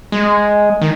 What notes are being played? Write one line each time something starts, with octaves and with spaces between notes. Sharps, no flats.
G#3
D#3